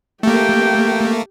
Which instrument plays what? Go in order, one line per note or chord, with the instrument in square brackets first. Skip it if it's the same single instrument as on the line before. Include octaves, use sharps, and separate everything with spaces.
[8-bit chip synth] A3 A#3 [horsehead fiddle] G4 G5